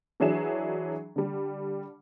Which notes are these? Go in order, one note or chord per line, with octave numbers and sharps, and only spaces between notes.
E3 F#3 D4 G#4 E5 E7
D3 G3